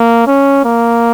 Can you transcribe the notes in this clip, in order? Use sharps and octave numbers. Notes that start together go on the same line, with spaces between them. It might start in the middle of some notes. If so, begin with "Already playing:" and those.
Already playing: A#3
C#4
A#3